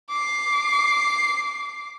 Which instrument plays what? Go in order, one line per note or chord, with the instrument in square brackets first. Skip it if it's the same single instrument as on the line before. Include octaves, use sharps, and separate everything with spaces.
[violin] D6 C7